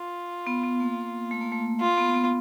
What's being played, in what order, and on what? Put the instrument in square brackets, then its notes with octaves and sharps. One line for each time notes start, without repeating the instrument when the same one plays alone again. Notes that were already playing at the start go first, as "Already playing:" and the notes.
Already playing: [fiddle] F4
[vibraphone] B3
B3
A#3
A3
A#3
A3
[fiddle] F4
[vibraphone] B3
B3